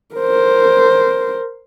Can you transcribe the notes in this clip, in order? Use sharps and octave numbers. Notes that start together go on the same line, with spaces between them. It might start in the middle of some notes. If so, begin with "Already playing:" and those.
A#4 C5